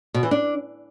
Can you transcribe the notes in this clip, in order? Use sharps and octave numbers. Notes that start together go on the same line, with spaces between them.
B2
E3
D4